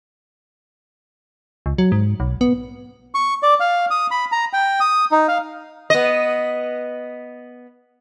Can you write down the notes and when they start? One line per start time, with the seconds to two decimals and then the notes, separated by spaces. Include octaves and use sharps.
1.66 C#2
1.78 F#3
1.92 G#2
2.20 B1
2.41 B3
3.15 C#6
3.43 D5
3.60 F5
3.91 D#6
4.11 B5
4.32 A#5
4.53 G5
4.80 D#6
5.11 D#4
5.28 F5
5.90 B3 D#5